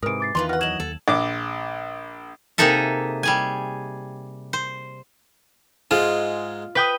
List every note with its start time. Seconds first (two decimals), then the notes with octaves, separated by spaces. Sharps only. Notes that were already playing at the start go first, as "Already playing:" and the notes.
0.03 G#2 C3 E3 A#4 D#6 D7
0.20 D6 A6 C7
0.35 E2 D#3 E3 F4 B4 A#5 C6
0.49 F#4 F#5 F6
0.61 F#3 D#5 G#6 E7 F#7
0.80 D#2 A4
1.08 A#1 D6
2.58 C3 A#3 D#4 G#4 A4 E5
3.23 G3 G#4 G#5
4.53 C5
5.91 G#2 G#3 F4
6.75 B4 G5 D#6